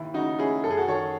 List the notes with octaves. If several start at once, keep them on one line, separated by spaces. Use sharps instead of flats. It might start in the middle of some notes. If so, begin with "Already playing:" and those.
Already playing: D#2 E4
C#3 D#4 F#4
C#4 E4 G#4
F#2 A4
G#4
F#4 A4
D#3 A4 C#5